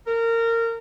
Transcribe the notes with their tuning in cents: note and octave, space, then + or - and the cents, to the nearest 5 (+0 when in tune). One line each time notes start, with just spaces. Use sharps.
A#4 -20